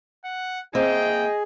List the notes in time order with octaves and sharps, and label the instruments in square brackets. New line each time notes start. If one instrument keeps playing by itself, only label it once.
[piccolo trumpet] F#5
[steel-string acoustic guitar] A#3 C4 E5 [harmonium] G#4 [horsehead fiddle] D#5 [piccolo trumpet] G5